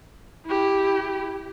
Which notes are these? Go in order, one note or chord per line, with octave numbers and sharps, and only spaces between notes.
E4 G4